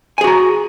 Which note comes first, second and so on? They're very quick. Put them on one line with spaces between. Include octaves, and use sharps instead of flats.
G#5 G#4 F#4 A#5